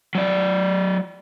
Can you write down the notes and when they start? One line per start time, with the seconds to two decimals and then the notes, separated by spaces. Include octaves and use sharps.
0.15 F#3 D5